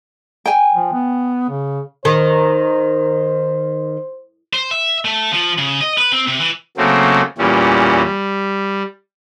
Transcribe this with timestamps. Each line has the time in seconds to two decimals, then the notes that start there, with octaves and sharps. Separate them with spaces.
0.46 G5 G#5
0.74 F3
0.93 B3
1.49 C#3
2.05 D#3 C5
4.53 C5
4.71 E5
5.05 A3
5.33 F3
5.58 C#3
5.81 D#5
5.98 B4
6.12 C4
6.27 C3
6.40 E3
6.77 C#3 F#3 A3 A#3 C4
7.38 E2 A#2 E3 G3 C#4
8.04 G3